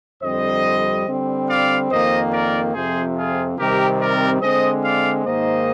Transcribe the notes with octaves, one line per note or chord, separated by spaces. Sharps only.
F2 D3 G3 C4 C5 D#5
D3 G3 C4
D5 F5
F2 D#3 A#3 C5 D#5
A#4 D5
F2 C3 F3 C4 G#4 C5
F4 G#4
C3 D#3 G3 C4 G4 A#4
A#4 D5
D3 G#3 C4 C5 D#5
D5 F5
G#2 D#3 A#3 C5 D#5